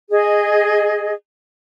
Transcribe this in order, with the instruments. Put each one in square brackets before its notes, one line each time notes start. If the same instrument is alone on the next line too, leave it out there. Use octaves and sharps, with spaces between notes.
[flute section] G#4 D#5